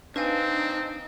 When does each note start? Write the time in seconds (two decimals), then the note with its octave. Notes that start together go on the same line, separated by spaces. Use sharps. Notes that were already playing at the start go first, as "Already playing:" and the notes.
0.16 C4 D4 D#4 B4 F5 G#5